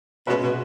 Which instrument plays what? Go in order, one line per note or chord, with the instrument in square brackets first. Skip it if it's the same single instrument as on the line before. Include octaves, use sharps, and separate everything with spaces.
[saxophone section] B2 [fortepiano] G#3 C#4 F#4 B4 E5
[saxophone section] B2